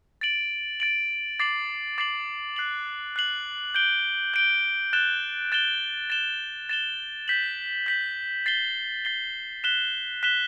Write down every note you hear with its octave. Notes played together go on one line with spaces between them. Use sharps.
A6 D7 F#7
A6 D7 F#7
D6 A6 C7 F#7
D6 A6 C7 F#7
F#6 C7 F#7
F#6 C7 F#7
G6 D7 G7
G6 D7 G7
F#6 A6 E7 G7
F#6 A6 E7 G7
A6 E7 G7
A6 E7 G7
G6 B6 F#7
G6 B6 F#7
A6 C7 G7
A6 C7 G7
F#6 B6 E7 G7
F#6 B6 E7 G7